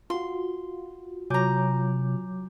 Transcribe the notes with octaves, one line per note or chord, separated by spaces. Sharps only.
F4 F#4 C6
C3 F#3 G#5 A#5 D6 G6